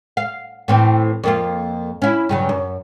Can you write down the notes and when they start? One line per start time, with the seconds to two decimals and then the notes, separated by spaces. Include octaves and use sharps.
0.17 F5
0.68 A2 E3 C4
1.24 F2 A#3 F4
2.02 C#4 E4
2.29 G2 C#3 F#3
2.49 F#2